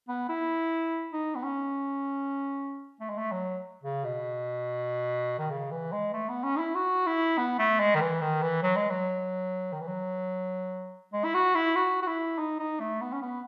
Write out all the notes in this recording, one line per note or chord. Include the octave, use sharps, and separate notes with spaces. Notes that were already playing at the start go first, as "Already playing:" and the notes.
B3
E4
D#4
B3
C#4
A3
G#3
A3
F#3
C#3
B2
D#3
C#3
E3
G#3
A3
B3
C#4
D#4
E4
F#4
E4
B3
A3
G#3
D#3
E3
D#3
E3
F#3
G#3
F#3
D#3
E3
F#3
G#3
E4
F#4
E4
F#4
F#4
E4
D#4
D#4
A3
B3
C#4
B3